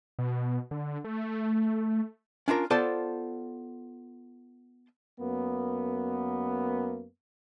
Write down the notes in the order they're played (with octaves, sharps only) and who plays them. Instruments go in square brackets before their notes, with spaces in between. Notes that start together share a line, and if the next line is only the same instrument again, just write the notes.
[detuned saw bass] B2
D3
A3
[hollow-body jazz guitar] C#4 D4 F4 A#4
B3 F4 A4 C5 D5 A5
[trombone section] F#2 A#3 B3